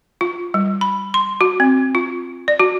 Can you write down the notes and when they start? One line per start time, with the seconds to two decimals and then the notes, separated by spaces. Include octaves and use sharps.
0.21 F4
0.54 G3
0.81 B5
1.14 C6
1.41 F#4
1.60 C4
1.95 F4
2.48 D5
2.60 F#4